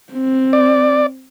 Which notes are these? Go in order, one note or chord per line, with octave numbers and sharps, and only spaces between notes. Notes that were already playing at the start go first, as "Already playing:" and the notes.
C4
D5